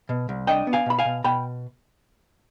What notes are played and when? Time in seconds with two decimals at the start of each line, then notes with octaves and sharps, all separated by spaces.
0.09 B2
0.29 C2
0.47 D4 D#5 G5
0.67 B3
0.73 F5 G#5
0.86 B2 B5
0.99 F5 G#5
1.05 B2
1.24 B2 G5 B5